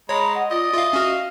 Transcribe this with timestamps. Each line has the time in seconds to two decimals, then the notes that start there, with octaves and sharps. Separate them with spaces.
0.09 G#3 C#5 A#5 B5
0.35 D#5 F#5
0.51 F4 D5 D#5
0.73 F4 E5 F5
0.93 C#4 F#4 F5